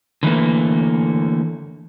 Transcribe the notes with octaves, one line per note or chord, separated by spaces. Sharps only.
D3 E3 A3 A#3